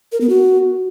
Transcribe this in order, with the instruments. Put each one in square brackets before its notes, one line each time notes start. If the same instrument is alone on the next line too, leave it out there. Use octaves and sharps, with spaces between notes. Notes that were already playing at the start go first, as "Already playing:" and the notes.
[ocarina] A#4
B3
F#4